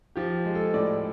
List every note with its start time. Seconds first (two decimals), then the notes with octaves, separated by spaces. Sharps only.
0.16 F3 G4
0.45 G#3
0.55 A4
0.74 A2 D5